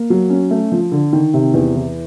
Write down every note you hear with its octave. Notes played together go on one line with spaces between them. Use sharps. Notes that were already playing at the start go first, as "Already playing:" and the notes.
Already playing: A#3
F#3
C#4
A3
F3
D3
D#3
C3
E2
E3